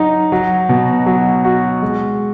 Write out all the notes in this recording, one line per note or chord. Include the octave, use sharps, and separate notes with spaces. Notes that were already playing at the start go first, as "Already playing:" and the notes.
Already playing: F#3 D#4
F#3
B2
F#3
F#4
G#3